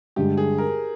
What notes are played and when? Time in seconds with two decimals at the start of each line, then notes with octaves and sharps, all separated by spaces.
0.16 G2 D3 G#3 G4
0.37 G#4
0.58 A#4